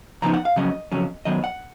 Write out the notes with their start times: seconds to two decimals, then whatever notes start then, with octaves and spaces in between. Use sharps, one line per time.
0.22 C#3 F3 B3 D#4 A#5
0.34 F#5
0.45 F5
0.56 F2 C#3 F#3 C#4 D#5
0.92 F2 C#3 F#3 C#4
1.25 F#2 D#3 F#3 B3 D#5
1.44 F#5